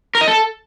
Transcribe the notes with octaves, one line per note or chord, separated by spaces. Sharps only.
A#4
D#5
A4